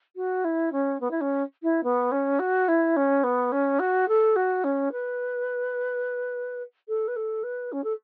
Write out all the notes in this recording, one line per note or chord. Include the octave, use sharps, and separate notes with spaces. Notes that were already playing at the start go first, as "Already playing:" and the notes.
F#4
E4
C#4
B3
E4
C#4
E4
B3
C#4
F#4
E4
C#4
B3
C#4
F#4
A4
F#4
C#4
B4
A4
B4
A4
B4
C#4
A4